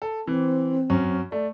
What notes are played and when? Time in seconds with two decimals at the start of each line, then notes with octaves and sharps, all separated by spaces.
0.02 A4
0.27 E3 C4
0.90 F#2 C#4
1.32 A3 D5